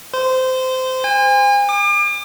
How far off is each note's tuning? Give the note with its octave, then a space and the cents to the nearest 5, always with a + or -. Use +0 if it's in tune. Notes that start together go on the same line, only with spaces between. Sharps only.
C5 -20
G#5 -40
D6 +40